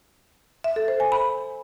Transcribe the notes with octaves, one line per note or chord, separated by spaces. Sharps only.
E5
A4
C5
G#5
B5